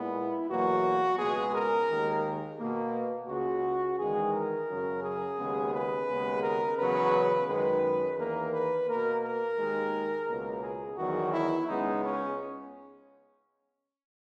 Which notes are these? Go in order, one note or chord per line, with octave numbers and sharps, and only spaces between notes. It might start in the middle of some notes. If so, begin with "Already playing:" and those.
Already playing: A#2 G#3 B3 E4
E2 B2 F#3 A#3 F#4
C#2 B2 G#3 B3 G#4
A#4
D#2 D#3 G#3
B2 A#3
C#2 C#3 G#3 F#4
E2 D#3 G#3 G#4
A#4
F#2 C#3 F#3
G#4
D#2 C#3 G#3 B3
B4
D#2 C#3 G#3 B3
A#4
E2 C#3 F#3 B3 B4
F#2 D#3 G#3 B4
E2 D#3 A#3 A#4
B4
B2 A#3 A#4
A#4
D#2 D#3 G#3
C#2 B2 A#3
G#4
E2 D#3 F#3 B3 F#4
E4
C#2 C#3 G#3 B3 D#4
C#4